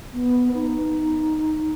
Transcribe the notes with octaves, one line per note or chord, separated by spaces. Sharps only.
B3
D#4